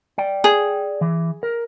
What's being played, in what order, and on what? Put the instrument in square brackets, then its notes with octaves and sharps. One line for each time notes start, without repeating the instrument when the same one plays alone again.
[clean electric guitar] D5 G5
[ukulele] G#4
[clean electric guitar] E3
A#4